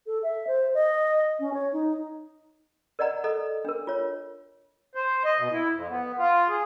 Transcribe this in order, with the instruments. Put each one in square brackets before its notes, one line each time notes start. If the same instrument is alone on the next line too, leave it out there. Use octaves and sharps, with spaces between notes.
[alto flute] A4
E5
C5
D#5
C#4
C#5
D#4
[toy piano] A#4 D5 D#5 F#5 A#5
A4 D#5 A#5
D4 A#4
F4 C#5
[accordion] C5
D#5
B2
E4
F2
B3
F4
G#4